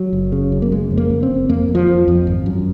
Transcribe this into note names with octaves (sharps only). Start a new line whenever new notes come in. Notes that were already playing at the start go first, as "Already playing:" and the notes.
Already playing: F#3
F#1
C#3
F#2
A#3
C#3 G#3
F2
A#3
C#3
C4
F#1
F2 A#3
F2
F3
F2
F2
G#1
F#2